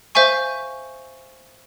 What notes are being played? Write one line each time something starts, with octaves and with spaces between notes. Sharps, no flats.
C5 E5 F5 G#5 C#6